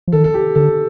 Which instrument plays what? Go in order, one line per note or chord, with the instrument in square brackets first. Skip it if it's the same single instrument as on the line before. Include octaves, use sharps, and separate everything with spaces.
[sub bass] F3
[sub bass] D#3 [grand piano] A4
[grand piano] A4
G4
[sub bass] D3 [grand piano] A4